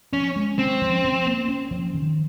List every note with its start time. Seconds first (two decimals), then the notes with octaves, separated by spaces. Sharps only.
0.13 F3 C#4
0.36 G#3
0.59 C4 C#4
0.82 F3
1.04 F3
1.26 A#3
1.48 C#4
1.71 F3
1.94 D#3